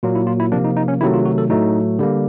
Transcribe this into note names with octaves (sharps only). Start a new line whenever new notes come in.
A#2 F#3 A#3 F4
E4
F4
E4
C3 F3 A#3 D4
D#4
D#4
C#4
C3 D#3 F#3 A3 E4
F4
F#4
A4
A2 F#3 A3 D#4
D3 G3 A#3